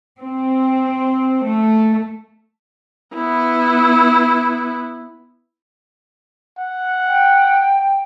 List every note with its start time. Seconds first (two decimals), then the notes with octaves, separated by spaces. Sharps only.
0.19 C4
1.45 A3
3.15 B3 E4
6.59 F#5
7.06 G5